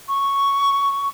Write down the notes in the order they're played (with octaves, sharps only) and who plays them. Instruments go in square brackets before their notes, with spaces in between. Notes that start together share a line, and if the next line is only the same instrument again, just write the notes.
[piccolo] C#6